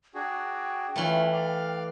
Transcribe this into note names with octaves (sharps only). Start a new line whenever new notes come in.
D4 F#4 G#4 G5
E3 A3 C#4 F4 B4
D5 F5 F6